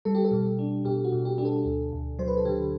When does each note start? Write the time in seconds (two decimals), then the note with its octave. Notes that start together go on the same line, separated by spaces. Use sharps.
0.05 G3 A4
0.15 G4
0.25 A4
0.31 B2
0.59 D4
0.85 B2 G4
1.04 F#4
1.12 B2
1.25 G4
1.38 D4 G4
1.45 A4
1.64 D2
1.92 D2
2.19 F#3 C5
2.28 B4
2.37 A4
2.45 D3 G4